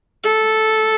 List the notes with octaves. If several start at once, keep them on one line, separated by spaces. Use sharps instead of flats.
A4